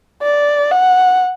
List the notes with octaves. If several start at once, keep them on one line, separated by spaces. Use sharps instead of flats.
D5
F#5